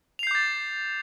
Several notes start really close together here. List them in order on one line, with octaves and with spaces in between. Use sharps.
F7 C7 G6 D6 A6